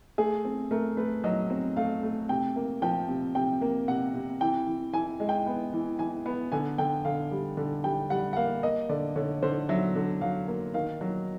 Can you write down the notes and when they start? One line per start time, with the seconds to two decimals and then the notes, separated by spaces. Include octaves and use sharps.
0.18 A3 G#4
0.45 C4
0.71 A3 A#4
0.97 A3 B4
1.24 F#3 D#5
1.50 C4
1.77 A3 F5
2.03 A3
2.29 C3 G5
2.56 A#3
2.82 F3 G5
3.08 C3
3.35 C3 G5
3.61 A#3
3.88 C3 F#5
4.14 C3
4.41 E3 G5
4.67 E3
4.93 E3 G#5
5.20 G#3
5.29 G5
5.46 B3
5.73 E3
5.99 E3 G#5
6.26 B3
6.52 D3 G#5
6.78 D3 G5
7.05 D3 F5
7.31 G3
7.57 D3
7.84 G3 G5
8.10 G3 F#5
8.33 F#5
8.36 A#3 F5
8.63 A#3 D#5
8.89 D3 D5
9.16 D3 C#5
9.42 D3 C5
9.69 F#3 E5
9.95 D3
10.21 F#3 F5
10.48 A#3
10.74 D#3 F5
11.01 F#3